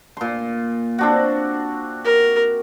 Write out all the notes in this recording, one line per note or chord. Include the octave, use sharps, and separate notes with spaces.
A#2 C6
C4 D4 F#4
A#4